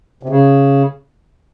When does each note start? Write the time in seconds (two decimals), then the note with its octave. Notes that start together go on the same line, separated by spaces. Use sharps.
0.23 C3
0.29 C#3